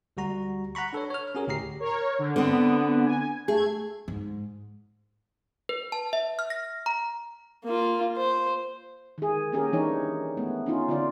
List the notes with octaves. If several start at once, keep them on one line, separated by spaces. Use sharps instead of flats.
D2 G3 F#4 A#5
F#5 A#5 B5 C#6
D4 A4 B4 C#5
C#5 F6
C#4 F#4 G#4 A#4 C#5
D2 A2 G4 A#5 C7
A#4 C#5
D3
D3 B3 C4
G#5
A3 G#4 G#6
G#2
B4
A5
E5
F6
A#6
A#5
A#3 F4
C5
D#3 G#4
A#3 C#4 G4 G#4 A#4
E3 D4 D#4 G4 C#5
A3 B3
C#4 D#4 F4
D3 F4 D5